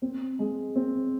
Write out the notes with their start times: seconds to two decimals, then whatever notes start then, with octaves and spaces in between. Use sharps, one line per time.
0.02 C4
0.39 G#3
0.76 C4